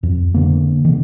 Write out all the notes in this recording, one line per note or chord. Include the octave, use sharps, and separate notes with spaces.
F2
D3 A#3
C3 D#3